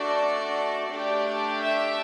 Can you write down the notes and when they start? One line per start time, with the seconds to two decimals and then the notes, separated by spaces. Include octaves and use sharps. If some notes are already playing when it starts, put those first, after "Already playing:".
Already playing: A3 D4 F#4 A4 D5
0.90 A3 D4 G4 D5
1.62 E5